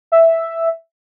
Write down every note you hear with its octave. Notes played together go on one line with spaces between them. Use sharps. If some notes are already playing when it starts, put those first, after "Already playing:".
E5